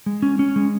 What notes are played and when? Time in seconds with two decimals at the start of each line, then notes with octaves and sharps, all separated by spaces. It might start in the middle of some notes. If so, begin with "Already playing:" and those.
0.06 G#3
0.22 C#4
0.39 C#4
0.56 G#3